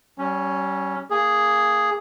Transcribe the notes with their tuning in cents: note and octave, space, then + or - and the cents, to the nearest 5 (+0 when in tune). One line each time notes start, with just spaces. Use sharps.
G3 -35 C#4 +0
A#3 -15 G#4 +0